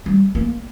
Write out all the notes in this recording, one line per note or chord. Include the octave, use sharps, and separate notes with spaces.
G3
A#3